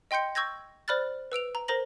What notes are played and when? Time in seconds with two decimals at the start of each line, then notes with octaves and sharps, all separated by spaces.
0.11 D#5 G5 C6 G6 C#7
0.35 C#6 E6 G6 G#6 A#6
0.88 C5 D5 B5 F6 F#6 A6
1.32 B4 E6 D7 F7
1.55 A#5
1.68 A#4 C5 A#5 A#6 F#7